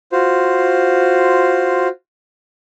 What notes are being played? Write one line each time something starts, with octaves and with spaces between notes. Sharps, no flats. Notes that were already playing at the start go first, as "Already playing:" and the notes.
F4 F#4 C5